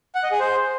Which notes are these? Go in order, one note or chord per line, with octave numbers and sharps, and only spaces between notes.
F#5
D#5
G#4
C5